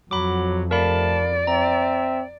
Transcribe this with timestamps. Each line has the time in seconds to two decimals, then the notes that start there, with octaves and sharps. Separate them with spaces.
0.11 F2 F#3 B5 D6
0.71 C3 A3 A#4 D5 F5 A5 B5
1.47 C4 E5 A#5